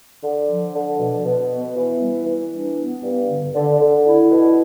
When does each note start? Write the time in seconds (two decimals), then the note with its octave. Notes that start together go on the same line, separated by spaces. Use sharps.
0.23 D3
0.48 F3
0.74 D3
1.00 B2
1.25 B2
1.50 B3
1.76 E3
2.01 G3
2.27 E3
2.52 D4
2.77 B3
3.03 G2
3.29 D3
3.55 D3
3.80 D3
4.06 E4
4.32 B2